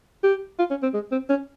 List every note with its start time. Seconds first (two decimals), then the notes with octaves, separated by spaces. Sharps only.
0.23 G4
0.59 F4
0.70 C#4
0.83 C4
0.94 G#3
1.12 C4
1.29 C#4